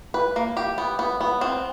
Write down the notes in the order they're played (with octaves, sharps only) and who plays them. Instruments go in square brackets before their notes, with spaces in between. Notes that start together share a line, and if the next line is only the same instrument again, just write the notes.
[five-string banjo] B4
A#3
G4
B3
B3
B3
C4